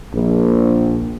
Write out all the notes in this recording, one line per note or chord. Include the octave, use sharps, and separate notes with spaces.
A#1